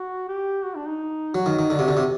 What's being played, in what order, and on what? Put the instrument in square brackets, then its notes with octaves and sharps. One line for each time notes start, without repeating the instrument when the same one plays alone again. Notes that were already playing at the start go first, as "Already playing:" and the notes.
Already playing: [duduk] F#4
G4
F#4
D4
D#4
[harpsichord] F#3 [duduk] F#4
[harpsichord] D#3
D#3
[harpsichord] D3 [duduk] F#4
[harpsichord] C3
D3
C3